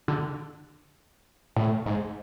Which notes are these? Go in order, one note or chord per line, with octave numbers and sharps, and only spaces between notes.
D3
A2
G#2